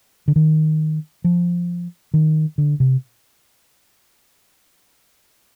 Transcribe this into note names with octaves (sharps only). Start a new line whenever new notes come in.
D3
D#3
F3
D#3
D3
C3